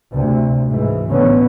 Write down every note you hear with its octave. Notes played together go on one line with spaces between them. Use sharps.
D2 C3
G#2 E3
A2 D3 E3 B3 C#4